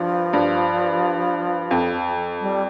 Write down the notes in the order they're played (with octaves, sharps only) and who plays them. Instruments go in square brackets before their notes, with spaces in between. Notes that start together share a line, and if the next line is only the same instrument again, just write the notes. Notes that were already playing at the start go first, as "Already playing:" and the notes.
Already playing: [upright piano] G2 [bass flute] F3
[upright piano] G2
F2
[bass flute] G3